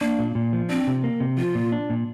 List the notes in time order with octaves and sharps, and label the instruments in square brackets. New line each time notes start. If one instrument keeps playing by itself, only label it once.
[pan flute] A#3 [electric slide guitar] D4
[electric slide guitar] A#2
A#2
F3
[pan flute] C4 [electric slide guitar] D4
[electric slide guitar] C3
A#3
C3
[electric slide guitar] F3 [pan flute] F4
[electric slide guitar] A#2
D4
A#2